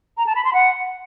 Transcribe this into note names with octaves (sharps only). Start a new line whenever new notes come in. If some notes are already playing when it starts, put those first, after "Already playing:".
A#5
A5
B5
C6
F#5